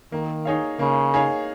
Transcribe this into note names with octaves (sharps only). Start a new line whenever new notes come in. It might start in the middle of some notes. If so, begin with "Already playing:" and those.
D#3 A#3
D#4 G#4 C#5 F5
C#3 A#3
D#4 G#4 C#5 F5